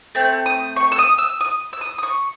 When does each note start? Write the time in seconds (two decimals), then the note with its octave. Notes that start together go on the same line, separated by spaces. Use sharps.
0.15 A3 C4
0.46 D#6
0.76 C#6
0.92 E6
0.99 D#6
1.18 E6
1.40 D#6
1.73 E6
1.81 D#6
1.98 D#6
2.03 C#6